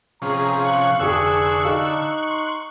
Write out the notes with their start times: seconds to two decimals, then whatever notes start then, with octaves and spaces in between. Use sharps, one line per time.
0.22 C3 F3 C#4 G#4 A#5
0.60 F5 C#6 F#6
1.00 F1 D3 G4 G#4 E6
1.65 D#4 G4 A4 F5
2.30 C6